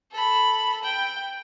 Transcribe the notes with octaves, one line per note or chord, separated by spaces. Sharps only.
A4 B5
G5